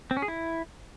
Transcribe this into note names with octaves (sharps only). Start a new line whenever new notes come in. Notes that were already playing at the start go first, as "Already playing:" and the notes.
C4
C#4
G#4
E4